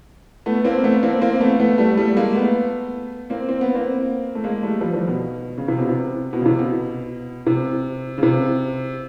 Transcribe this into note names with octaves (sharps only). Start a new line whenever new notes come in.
A3 B3
A#3 C4
A#3
A3 B3
A#3 C4
A#3 C4
A#3
A3 B3
A3 B3
G3 A3
G3 A3
G#3 A#3
A3 B3
A#3 C4
C4
B3
A#3 C4
A3
G#3 A#3
G3 A3
F3 G3
D#3 F3
B2
C#3
C3
B2
C3
B2
C#3
C3
B2
C3
C#3
C3